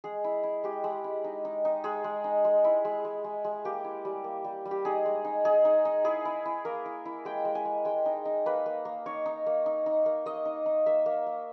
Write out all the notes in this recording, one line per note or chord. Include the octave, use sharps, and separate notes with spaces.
G#3 G#4
E4
E4
G#3 G4
G#3
E4
D#4
D#4
D#4
G#3 G#4
G#3
D#4
G#3
E4
G#3
G#3
G#3
G#3
A#3 G4
E4
G3
A#3
G3
G3
G4
D#4 G#4
G#3
D#4
D#4 G#4
D#4
D#4
E4 G#4
E4
E4
A#3 A#4
E4
E4
G#3 G5
G#3
G#5
G#3
G#3 G5
D#4
D#4
A#3 B4
A#3
A#3
D#4 C#5
D#4
A#3
D#4
D#4
A#3
A#3 D#5
D#4
D#4
A#3 E5
A#3
A#3